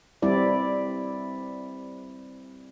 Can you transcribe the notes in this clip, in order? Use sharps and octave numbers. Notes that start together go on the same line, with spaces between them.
G3 C4 E4 D5